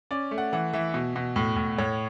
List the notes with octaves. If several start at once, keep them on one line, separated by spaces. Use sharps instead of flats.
C#4 D5
A3
F#5
E3 F#5
E3 E5
B2
B2
A2
A2
A2 C#5